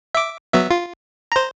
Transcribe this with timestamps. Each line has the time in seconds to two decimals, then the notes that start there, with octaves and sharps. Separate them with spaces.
0.15 E5 D6
0.53 F#3 B3 E5
0.71 F4
1.32 C5 A#5